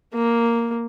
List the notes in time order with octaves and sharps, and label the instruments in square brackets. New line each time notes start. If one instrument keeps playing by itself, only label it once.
[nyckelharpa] A#3